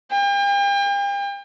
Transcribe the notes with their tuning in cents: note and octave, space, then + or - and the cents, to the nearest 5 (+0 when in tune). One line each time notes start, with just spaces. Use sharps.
G5 +40